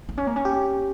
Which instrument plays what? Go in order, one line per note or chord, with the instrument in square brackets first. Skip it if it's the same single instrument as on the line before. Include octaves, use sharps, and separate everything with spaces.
[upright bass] A#3
C#4
A#3
C#4
[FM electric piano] G4